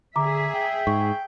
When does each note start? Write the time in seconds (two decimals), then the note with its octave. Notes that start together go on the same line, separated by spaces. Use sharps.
0.16 D3 G#4 E5 A#5 D6
0.54 G5
0.87 G#2 C#6